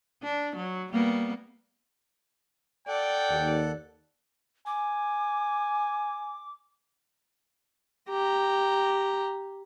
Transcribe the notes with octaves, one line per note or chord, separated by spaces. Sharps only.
D4
F#3
G3 A#3 B3
A4 D5 F#5 G5
D#2
G#5 D6
G4 A#5